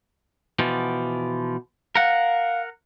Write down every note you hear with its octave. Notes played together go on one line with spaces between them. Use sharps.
B2 E3 F3
A#4 F5 F#5